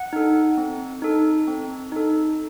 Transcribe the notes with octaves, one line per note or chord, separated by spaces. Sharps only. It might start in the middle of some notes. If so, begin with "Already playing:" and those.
Already playing: F#5
D#4 A4
C4
D#4 A4
C4
D#4 A4